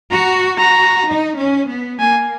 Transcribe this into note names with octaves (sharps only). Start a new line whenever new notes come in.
F#4 A#5
F#4 A#5
D#4
C#4
B3
A#3 G#5